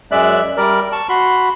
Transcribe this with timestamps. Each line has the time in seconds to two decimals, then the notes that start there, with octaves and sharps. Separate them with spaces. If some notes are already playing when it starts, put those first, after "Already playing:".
0.11 F#2 G#3 D5 E5 F#6
0.57 G3 A#4 D5
0.92 A5 C#6
1.09 F#4 B5 C6